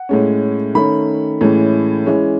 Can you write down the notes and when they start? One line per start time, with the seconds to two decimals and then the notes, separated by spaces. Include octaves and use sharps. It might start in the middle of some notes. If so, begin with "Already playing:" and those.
Already playing: F#5
0.09 A2 G#3 C#4
0.75 D#3 A3 C#4 B5
1.41 A2 E3 G#3 C#4
2.06 E3 G#3 C#4